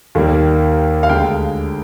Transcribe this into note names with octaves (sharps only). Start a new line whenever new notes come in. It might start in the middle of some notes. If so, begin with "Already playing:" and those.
D#2 D#3 G3 A#3
F5
D2 D3 G#3 G5